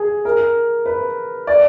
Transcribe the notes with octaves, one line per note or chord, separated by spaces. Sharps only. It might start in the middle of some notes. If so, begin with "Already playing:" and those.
Already playing: G#4
A#4
B4
D5